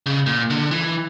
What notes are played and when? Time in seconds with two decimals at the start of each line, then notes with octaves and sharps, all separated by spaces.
0.06 C#3
0.27 A#2
0.50 D3
0.71 E3